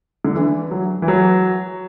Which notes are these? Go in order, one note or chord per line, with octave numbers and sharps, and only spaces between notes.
D3
E3
F#3
E3
F#3